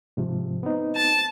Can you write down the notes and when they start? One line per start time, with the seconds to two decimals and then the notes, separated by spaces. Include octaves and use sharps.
0.17 G#2 C3 F3
0.63 B3 C4 D#4
0.96 A5